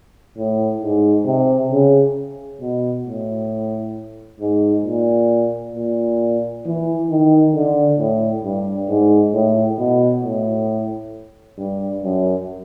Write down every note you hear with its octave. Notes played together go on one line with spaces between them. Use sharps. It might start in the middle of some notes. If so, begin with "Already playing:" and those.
A2
G#2
C3
C#3
B2
A2
G#2
A#2
A#2
E3
D#3
D3
A2
G2
G#2
A2
B2
A2
G2
F#2